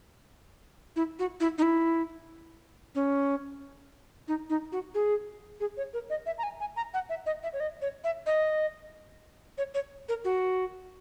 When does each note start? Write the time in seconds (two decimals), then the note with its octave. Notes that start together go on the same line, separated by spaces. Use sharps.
0.96 E4
1.19 F#4
1.40 E4
1.58 D#4
1.62 E4
2.95 C#4
4.28 D#4
4.50 D#4
4.72 F#4
4.94 G#4
5.60 G#4
5.77 C#5
5.94 A#4
6.10 D#5
6.26 E5
6.38 A#5
6.43 G#5
6.60 G#5
6.77 A#5
6.94 F#5
7.10 E5
7.26 D#5
7.43 E5
7.53 C#5
7.60 D#5
7.82 C#5
8.04 E5
8.26 D#5
9.58 C#5
9.74 C#5
10.09 A#4
10.25 F#4